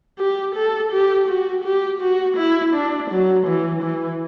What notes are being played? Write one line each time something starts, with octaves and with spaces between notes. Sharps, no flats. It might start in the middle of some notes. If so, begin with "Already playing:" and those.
G4
A4
G4
F#4
G4
F#4
E4
D4
F#3
E3
E3